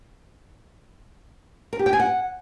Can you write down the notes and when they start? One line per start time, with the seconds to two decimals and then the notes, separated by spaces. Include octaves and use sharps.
1.73 A#4
1.79 G4
1.86 G5
1.93 G#5
1.99 F#5